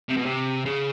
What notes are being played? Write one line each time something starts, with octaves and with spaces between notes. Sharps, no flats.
C3
B2
C3
C#3